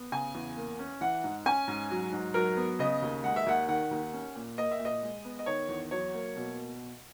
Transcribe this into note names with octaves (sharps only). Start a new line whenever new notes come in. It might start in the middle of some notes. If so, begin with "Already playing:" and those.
Already playing: B3
C#3 G#5
E2
A#3
C#4
E3 F#5
G#2
C#4 G#5
G#2
F#3
G#2
F#3 A#4
B3
C#3 D#5
D#2
G#3 F#5
E5
D#2 F#5
D#3 F#5
D#2
C#4
A#2
A#3 D#5
E5
A#2
D#5
G#3
B3
D#5
D#3 C#5
E2
F#3 C#5
A#3
B2